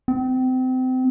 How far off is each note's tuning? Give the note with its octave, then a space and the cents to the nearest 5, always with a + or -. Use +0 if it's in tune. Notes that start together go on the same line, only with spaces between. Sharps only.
C4 -30